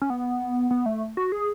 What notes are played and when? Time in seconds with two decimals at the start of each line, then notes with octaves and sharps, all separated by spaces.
0.02 C#4
0.10 B3
0.71 B3
0.86 A3
1.17 F#4
1.32 G#4